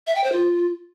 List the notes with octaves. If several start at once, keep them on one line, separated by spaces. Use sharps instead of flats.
E5
G5
C5
F4